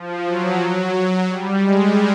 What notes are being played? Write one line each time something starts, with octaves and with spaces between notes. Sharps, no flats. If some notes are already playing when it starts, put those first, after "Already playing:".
Already playing: F3
F#3
F#3
G3
G#3